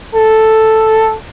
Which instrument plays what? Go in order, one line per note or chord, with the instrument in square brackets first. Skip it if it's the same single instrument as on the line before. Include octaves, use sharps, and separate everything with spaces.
[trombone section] A4